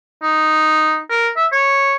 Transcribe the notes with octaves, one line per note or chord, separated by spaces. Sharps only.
D#4
A#4
E5
C#5